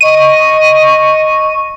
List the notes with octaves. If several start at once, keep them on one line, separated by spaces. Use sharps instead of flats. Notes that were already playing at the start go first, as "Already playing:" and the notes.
D#5 C#6 D#7